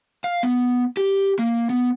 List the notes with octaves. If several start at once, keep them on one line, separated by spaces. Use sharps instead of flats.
F5
B3
G4
A#3
B3